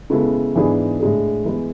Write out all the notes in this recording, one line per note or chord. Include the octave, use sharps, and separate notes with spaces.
C#3 G#3 B3 E4 A4
G#2 E3 B3 D4 G#4
A2 G#3 D4 G#4
E3 G#3 B3